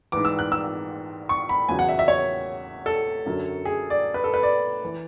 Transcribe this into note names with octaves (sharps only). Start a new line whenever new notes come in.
G#2 E3 D6
E6
F#6
E6
C#6
B5
E2 C#3 F#3 G#5
F#5
E5
E5
C#5
A4
F#2 D3 F#3
G#4
D5
B4
A4
B4
D5
E3